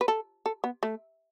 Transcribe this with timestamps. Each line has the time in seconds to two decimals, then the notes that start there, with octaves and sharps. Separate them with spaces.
0.01 B4
0.08 A4
0.46 A4
0.64 B3
0.83 A3